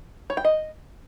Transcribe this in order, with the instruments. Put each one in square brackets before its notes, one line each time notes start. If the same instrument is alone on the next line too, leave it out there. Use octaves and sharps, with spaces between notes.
[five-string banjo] C#5
G5
D#5